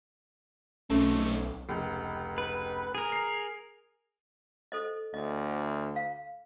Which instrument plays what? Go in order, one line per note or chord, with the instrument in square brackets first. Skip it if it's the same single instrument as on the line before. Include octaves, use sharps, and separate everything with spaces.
[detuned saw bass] B1 [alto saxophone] A3 [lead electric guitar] C4 D#4 [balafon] C#4
[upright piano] F1 C#2
[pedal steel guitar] B4
G#4 A#4
[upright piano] C7 F7
[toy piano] A4 C5 D#5
[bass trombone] D2 [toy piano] D#5
[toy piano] F5